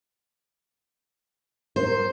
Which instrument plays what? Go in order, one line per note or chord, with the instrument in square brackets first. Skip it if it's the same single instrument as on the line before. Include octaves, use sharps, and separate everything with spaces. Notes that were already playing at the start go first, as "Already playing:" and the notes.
[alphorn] A#4 [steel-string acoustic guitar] C5